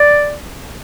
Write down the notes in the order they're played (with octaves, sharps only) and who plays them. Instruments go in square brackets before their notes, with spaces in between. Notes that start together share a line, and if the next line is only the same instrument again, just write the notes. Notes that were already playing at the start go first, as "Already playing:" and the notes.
Already playing: [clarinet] D5